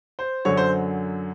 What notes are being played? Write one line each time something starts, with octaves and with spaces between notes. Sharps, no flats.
C5
F#2 D3 F#3 C#5
C5